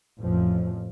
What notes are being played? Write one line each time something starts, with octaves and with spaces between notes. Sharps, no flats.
A1 F2 F3